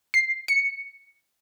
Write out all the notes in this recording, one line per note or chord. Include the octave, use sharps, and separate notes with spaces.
C7
C#7